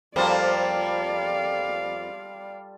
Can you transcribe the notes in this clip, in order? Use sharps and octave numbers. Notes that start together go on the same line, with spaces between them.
F2 G3 A#3 F4 A4 C5 D5 F5